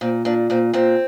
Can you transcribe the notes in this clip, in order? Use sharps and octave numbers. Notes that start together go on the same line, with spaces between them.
A#2 C4
A#2 D4
A#2 C4
A#2 C4